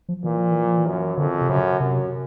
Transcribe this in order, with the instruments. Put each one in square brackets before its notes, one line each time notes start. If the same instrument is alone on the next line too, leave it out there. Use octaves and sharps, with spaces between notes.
[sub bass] F3
[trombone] A#2 [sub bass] E3
[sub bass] F3
E3
F3
E3
[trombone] F#2
[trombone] F2 [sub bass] D3
[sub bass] C3
[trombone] F#2 [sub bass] C#3
[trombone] F#2 [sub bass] C3